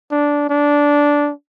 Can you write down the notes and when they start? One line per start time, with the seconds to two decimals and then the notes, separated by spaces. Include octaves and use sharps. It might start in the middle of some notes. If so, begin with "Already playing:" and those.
0.11 D4
0.49 D4